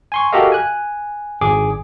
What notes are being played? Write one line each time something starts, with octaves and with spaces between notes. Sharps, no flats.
G#5 C6 C#6
F#4 G4 A4 A#4 D#5 F5
G#5 F#6
G#1 G#4 D6